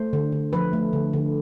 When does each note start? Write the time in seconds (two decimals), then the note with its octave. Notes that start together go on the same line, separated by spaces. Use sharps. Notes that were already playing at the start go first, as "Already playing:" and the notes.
Already playing: A3 C5
0.13 D3
0.32 D3
0.53 F3 B4
0.73 A3
0.93 D3
1.13 D3